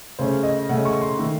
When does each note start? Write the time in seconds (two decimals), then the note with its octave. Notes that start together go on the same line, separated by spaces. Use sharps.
0.19 C#3 A3 C#4 C5
0.43 D#5
0.69 C#3 A3 C#4 F#5
0.85 C#6
1.01 C6
1.18 D#3 A3